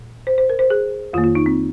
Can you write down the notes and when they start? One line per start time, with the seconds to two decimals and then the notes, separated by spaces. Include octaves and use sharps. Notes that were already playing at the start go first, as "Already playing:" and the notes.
Already playing: A#2
0.27 C5
0.38 C5
0.49 A#4
0.59 C5
0.70 G#4
1.13 F2 D#3 A#3 F4
1.24 F4
1.35 D#4
1.46 C4